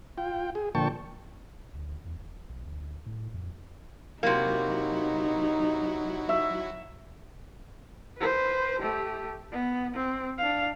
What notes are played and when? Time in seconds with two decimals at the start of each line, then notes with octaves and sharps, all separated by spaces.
0.18 F4 G5
0.55 G#4
0.75 A#2 D3 F3 G5 A5 C#6
1.75 D2
2.05 E2
2.17 D#1
2.49 B1
2.66 D2
3.06 A2
3.34 F2
4.23 C3 F#3 A#3 D#4 E4 F#4
6.29 E5
8.18 B4 C5
8.80 A3 G4
9.52 B3
9.95 C4
10.39 D4 F5